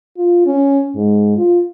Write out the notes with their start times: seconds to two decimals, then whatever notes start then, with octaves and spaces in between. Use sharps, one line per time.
0.17 F4
0.46 C#4
0.95 G#2
1.37 F4